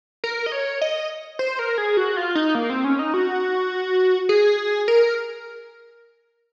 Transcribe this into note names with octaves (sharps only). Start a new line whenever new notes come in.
A#4
D#5
C#5
D#5
C5
A#4
G#4
F#4
F4
D#4
A#3
C4
C#4
D#4
F#4
G#4
A#4